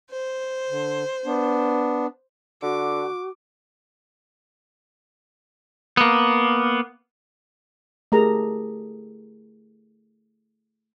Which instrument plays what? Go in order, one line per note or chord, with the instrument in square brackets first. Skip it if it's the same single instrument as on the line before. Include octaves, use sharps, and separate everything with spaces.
[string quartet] C5
[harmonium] D3
B3 D4
[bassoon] D3 [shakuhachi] F#4 [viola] D6
[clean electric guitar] A#3 B3
[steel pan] A3 G4 G#4 A#4 A#5